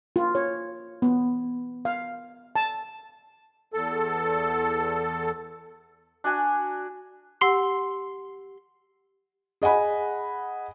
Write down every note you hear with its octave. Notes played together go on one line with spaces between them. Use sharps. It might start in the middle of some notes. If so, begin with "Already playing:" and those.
F4
C#5
B3
F5
A5
E2 A4
D4 F#4 G#5
G4 F#5 C6 E6
G#4 D#5 F#5 G#5 B5